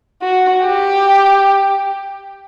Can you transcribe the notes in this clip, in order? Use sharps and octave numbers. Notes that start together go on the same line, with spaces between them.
F#4
G4